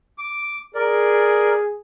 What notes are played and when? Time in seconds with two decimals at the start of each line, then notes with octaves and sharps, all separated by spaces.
0.18 D6
0.75 G#4 A#4 D5